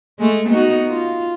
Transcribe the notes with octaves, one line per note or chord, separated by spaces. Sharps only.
G#3 A3
B3 D#4 F#4
F4